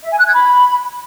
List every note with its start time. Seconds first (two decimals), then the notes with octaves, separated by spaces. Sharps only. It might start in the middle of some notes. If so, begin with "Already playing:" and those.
0.02 E5
0.10 G#5
0.18 F#6
0.26 G#6
0.34 B5